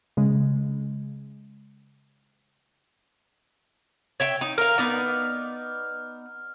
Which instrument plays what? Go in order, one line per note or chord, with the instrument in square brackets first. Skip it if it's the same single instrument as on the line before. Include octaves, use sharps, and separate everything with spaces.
[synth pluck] C#3 G#3
[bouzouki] C#5 E5 G5
D#4
[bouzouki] A#4 F5 [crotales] F6
[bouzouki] B3 D#4 D5